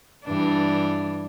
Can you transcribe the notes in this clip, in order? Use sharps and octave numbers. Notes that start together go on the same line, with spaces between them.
G2 E3 D4